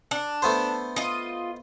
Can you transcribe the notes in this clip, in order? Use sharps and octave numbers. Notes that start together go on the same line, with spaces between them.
D4
A3 B3 C5
F4 D#5